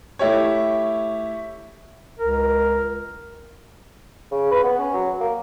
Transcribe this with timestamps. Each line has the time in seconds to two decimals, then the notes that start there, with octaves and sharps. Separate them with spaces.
0.19 A3 E4 G4 C#5
2.20 C#2 A#4
4.31 C#3
4.51 B4
4.64 B3
4.79 C#4
4.94 F#3
5.20 A#3